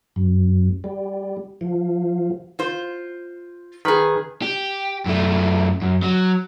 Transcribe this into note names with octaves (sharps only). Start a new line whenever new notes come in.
F#2
G3
F3
F4 C5
D#3 G#4 B4
G4
F#2 A3
F#2
F#3